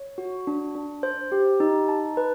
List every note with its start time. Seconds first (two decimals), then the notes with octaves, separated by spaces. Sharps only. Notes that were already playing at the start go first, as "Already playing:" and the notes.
Already playing: C#5
0.18 F#4
0.47 D4
0.75 D4
1.03 C5
1.32 G4
1.60 D#4
1.88 A5
2.17 B4